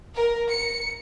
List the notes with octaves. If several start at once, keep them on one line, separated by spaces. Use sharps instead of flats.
A#4
C#7